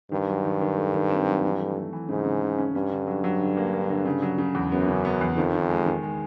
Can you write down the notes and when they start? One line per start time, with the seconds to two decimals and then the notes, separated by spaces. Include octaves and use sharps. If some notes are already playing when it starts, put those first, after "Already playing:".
0.12 G2 D#3
0.29 F#3
0.45 D#3
0.61 D#3
0.77 A3
0.94 D#3
1.10 C4
1.27 F#3
1.43 E3
1.60 A3
1.76 A3
1.93 E3
2.09 G#2 C#3
2.25 C#3
2.42 C#3
2.58 C#4
2.74 G2 C#4
2.91 D3
3.07 F#3
3.24 F#3
3.41 D3
3.57 A#3
3.74 A#3
3.90 D3
4.05 C#3
4.22 F#3
4.38 C#3
4.55 E2
4.71 F#2 B3
4.88 C#3
5.05 B3
5.21 E2
5.37 F2 D#3
5.53 D#3
5.70 G#3
5.86 D#3
6.03 G#3